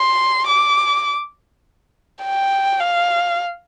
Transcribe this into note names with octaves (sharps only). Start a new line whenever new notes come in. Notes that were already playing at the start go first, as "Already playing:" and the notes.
Already playing: C6
D6
G5
F5